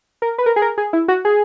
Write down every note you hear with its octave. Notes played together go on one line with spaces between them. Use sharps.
A#4
B4
A#4
G#4
A#4
G#4
E4
F#4
G#4